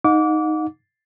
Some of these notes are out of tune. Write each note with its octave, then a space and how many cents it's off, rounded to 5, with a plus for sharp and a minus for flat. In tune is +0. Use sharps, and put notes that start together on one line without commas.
D#4 +0 F#5 -40 D6 -25